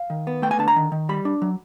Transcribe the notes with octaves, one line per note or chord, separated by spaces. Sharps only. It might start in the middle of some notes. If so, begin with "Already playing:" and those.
Already playing: F5
D#3
B3
A3 G5
G#5
D3 A5
A#5
D#3
D#3
G3 B5
D4
F#3